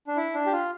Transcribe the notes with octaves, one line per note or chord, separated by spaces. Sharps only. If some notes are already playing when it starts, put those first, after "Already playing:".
D4
E4
D4
G4
F4